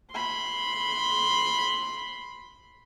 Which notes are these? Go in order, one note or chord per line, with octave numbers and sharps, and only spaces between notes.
B5 C6